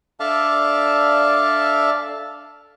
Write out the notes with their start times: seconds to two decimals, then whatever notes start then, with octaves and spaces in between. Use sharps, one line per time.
0.20 D4 A4 D5 E5 F5 A5